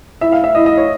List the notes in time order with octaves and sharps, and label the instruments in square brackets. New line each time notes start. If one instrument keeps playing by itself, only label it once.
[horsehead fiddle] E4 [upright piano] E5
[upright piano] F5
E5
[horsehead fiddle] E4 [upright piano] D#5
[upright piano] D#5
C#5